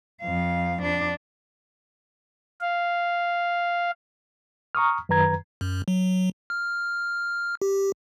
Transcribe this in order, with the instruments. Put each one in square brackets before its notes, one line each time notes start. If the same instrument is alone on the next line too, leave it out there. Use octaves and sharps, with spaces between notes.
[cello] F2 F5
F2 D4
[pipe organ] F5
[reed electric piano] A#5 C#6 D#6 F6
F#2 D#3 B4 A#5 G#6
[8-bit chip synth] F#2
F#3
F6
G4